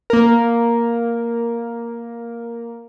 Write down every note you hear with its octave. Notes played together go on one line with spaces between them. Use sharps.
A#3 A#4